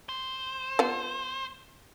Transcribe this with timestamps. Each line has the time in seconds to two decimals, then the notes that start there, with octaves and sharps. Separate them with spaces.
0.09 C5
0.79 B3 F4